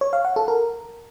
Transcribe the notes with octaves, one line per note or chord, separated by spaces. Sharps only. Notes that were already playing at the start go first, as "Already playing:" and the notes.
C#5
F5
F#5
A4
A#4